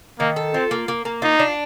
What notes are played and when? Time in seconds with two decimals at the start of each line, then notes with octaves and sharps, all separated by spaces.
0.20 D#3 A#3
0.36 A4
0.54 C4 F4
0.71 A#3
0.88 A#3
1.05 A#3
1.22 D#4 F4
1.39 D4